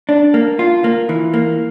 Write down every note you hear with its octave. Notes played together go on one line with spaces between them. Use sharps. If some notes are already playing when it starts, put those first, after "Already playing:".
D4
A#3
F4
A#3
E3
A#3